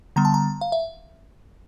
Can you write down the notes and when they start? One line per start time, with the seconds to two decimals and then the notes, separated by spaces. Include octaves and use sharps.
0.16 D3 G3 B3 A#5
0.25 A5
0.34 A#5
0.61 F5
0.72 E5